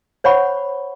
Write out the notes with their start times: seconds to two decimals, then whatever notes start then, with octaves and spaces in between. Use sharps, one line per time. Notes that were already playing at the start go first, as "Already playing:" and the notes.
0.24 C5 C#5 F#5 B5 C#6